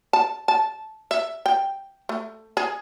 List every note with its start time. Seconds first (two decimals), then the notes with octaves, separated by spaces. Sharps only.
0.13 A5
0.48 A5
1.11 E5
1.46 G5
2.09 A3
2.57 G#4